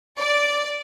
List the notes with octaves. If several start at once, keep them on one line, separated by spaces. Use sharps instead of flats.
D5